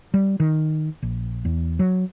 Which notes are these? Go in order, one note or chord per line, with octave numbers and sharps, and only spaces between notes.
G3
D#3
A#1
E2
F#3